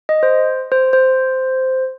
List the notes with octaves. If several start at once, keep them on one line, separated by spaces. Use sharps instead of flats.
D#5
C5
C5
C5